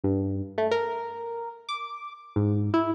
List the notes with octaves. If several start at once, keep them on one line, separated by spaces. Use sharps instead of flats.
G2
A3
A#4
D6
G#2
E4